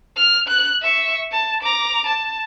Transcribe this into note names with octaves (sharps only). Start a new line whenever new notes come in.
F6
F#6
E5 C#6
A5
A#5 D6
A5